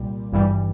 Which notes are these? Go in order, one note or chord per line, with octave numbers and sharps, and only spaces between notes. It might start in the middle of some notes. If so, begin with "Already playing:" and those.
Already playing: C2 A#2 G3
G#1 G2 E3 G3